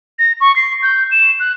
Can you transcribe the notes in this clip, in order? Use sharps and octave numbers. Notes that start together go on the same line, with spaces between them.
A#6
C#6
C7
G6
E7
F#6